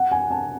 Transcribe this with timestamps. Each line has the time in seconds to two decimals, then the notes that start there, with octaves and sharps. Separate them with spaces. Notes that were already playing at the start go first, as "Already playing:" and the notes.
Already playing: F#5
0.12 G#5
0.31 A5